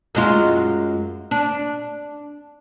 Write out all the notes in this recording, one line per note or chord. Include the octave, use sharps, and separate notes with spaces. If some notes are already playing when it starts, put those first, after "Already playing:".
F#2 G#3 F4
D4